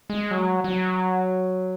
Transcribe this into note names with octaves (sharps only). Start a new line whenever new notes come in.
G#3
F#3
F#3